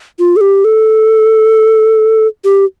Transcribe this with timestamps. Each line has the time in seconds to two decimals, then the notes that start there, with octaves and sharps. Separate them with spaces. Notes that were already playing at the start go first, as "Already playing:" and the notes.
0.19 F4
0.36 A4
0.41 G4
0.64 A4
2.44 G4